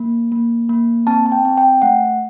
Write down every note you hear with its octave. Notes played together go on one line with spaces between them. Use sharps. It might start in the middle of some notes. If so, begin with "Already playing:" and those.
Already playing: A#3
A#3
A#3
C4 A5
A5
G5
C4
G5
A3 F#5